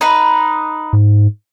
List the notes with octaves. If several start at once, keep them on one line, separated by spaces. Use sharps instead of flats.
D#4 B4
G#2